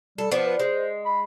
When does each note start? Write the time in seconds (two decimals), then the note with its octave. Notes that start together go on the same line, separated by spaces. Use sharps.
0.18 G3 A4
0.31 F3 B3 D4 D5
0.46 B4
0.60 G#3 C5
1.06 B5